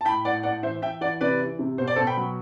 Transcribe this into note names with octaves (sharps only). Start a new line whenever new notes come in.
A5
A2 G5 B5
A2 D5 F#5
A2 D5 F#5
E3 C5 E5
E3 E5 G5
E3 D5 F#5
C3 B4 D5
E3
C3
B2 C5
D5
B2 A4 C5
G5 B5
F#3